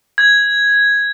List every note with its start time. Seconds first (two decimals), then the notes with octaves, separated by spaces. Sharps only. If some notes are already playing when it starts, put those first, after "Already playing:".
0.18 G#6